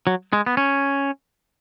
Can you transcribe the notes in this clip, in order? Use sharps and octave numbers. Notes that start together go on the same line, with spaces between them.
F#3
G#3
B3
C#4